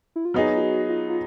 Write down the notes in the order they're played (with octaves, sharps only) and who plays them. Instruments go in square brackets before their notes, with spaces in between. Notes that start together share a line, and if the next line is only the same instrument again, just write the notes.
[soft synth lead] E4
F4
[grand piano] F#3 B3 D#4 G#4 [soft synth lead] F#4
[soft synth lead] F4
F#4
F4
F4